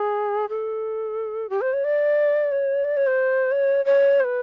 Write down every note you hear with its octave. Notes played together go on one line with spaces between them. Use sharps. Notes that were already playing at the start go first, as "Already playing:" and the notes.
Already playing: G#4
A4
G4
C5
C#5
D5
C#5
D5
C#5
C5
C#5
C#5
C5
B4